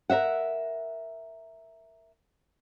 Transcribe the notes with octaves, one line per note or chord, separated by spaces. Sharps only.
A#4 C5 E5 F#5